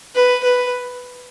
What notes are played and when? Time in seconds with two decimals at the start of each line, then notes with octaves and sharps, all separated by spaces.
0.15 B4
0.44 B4